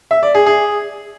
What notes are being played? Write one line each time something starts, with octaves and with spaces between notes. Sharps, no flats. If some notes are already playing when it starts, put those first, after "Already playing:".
E5
D5
G#4
G#4